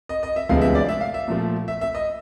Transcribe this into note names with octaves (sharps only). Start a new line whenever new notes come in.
D#5
D#5
E5
D2 C3 F3 G#3 B3 F5
E5
D5
E5
F5
E5
A#2 F3 A3
E5
E5
D#5